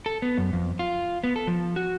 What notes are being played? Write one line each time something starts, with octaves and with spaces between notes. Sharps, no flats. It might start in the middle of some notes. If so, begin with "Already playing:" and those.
A4
B3
F#2
F2
F4
B3
A4
F3
F#4